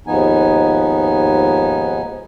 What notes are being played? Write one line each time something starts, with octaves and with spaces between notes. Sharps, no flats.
D#2 G#2 F3 B3 D#4 G#5